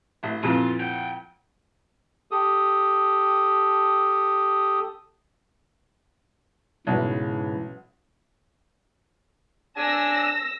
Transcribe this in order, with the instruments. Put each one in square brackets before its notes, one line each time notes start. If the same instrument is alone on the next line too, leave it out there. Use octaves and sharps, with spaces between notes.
[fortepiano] A1
[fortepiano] F2 A#2 E3 [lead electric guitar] F4
[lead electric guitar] F#5 G5
[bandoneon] G4 A4 D#6
[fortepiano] B1 [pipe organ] G#2 C#3 E3
[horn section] D4 G#5 [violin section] E6 A#6